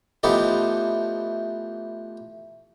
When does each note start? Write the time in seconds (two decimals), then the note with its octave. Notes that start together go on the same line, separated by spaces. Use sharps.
0.23 E3 F3 A3 B3 D#4 G4